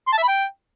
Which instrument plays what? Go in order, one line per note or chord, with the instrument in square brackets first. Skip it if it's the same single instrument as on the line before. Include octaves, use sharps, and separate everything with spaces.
[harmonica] C6
A5
E5
B5
G5